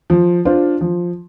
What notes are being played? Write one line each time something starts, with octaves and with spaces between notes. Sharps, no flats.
F3
D4 F4 C5
F3